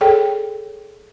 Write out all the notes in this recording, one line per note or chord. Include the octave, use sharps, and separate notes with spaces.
G#4 A4 C#5 G5